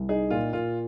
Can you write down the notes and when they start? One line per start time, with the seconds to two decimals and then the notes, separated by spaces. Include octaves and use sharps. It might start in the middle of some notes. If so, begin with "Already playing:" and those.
Already playing: C2
0.09 D#4 G#4
0.30 A#2 F4
0.53 A#2 F4